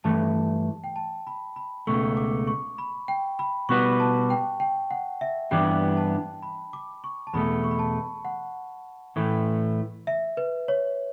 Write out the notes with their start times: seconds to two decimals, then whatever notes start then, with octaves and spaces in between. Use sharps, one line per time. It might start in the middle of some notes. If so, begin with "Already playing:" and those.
0.04 G2 E3 A3 A5
0.84 G5
0.96 A5
1.27 B5
1.56 B5
1.87 C#2 B2 A3 C#6
2.17 D6
2.47 C#6
2.78 B5
3.08 G5
3.39 B5
3.69 B2 G3 B3 F#4 B4 C#6
4.00 A5
4.30 G5
4.60 G5
4.91 F#5
5.21 E5
5.51 G2 E3 G3 B3 D4 G5
5.97 A5
6.42 B5
6.73 D6
7.04 C#6
7.27 A5
7.33 E2 B2 A3 B5
7.64 C#6
7.71 B5
7.79 A5
8.25 F#5
9.16 A2 E3 A3
10.07 E5
10.37 B4
10.68 C#5